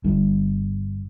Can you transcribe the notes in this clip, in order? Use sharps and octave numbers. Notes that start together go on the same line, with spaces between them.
G1 G2